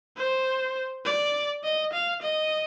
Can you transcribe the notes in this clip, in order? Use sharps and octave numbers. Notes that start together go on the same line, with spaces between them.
C5
D5
D#5
F5
D#5